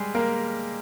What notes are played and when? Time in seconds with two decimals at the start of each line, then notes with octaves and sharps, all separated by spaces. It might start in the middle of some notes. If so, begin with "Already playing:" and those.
Already playing: G3 G#3 G#4
0.15 A#3 A#4